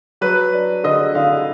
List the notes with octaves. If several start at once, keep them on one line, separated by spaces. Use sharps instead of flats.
F#3 B4
D4
D3 D#5
D3 F5